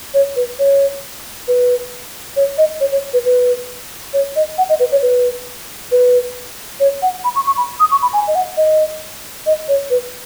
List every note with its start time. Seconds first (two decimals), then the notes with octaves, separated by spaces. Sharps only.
0.14 C#5
0.36 B4
0.59 C#5
1.48 B4
2.36 C#5
2.58 D#5
2.80 C#5
2.92 C#5
3.13 B4
3.25 B4
4.13 C#5
4.36 D#5
4.58 F#5
4.69 D#5
4.80 B4
4.92 C#5
5.02 B4
5.92 B4
6.80 C#5
7.02 F#5
7.24 B5
7.36 C#6
7.47 C#6
7.57 B5
7.80 D#6
7.91 C#6
8.02 B5
8.13 G#5
8.28 D#5
8.35 F#5
8.57 D#5
9.46 D#5
9.68 C#5
9.90 B4